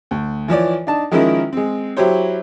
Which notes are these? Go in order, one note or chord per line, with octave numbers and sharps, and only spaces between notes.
D2
E3 F3 C#5 D5
D4 D#4 A5
D#3 F3 G#3 C#4 E4 A#4
G#3 C4
F#3 E4 G4 C5 C#5